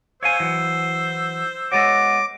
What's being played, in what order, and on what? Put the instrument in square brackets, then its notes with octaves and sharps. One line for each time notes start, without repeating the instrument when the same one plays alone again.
[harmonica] C5 E6 [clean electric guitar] C#5 F5 G#5
[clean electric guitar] E3 F#3
[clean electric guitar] G#3 B3 F#4 [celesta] C#5 A6 A#6 [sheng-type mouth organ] D6